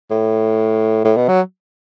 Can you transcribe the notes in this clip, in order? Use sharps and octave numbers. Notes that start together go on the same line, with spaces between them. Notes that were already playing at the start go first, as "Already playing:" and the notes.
A2
A2
B2
F#3